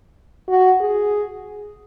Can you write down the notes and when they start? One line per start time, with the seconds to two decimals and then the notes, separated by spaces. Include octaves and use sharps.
0.49 F#4
0.81 G#4